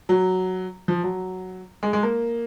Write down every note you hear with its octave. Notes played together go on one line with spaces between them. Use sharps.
F#3
F3
F#3
G#3
G#3
A#3